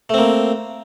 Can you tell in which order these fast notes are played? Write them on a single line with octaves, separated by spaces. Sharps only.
A3 C4 A#3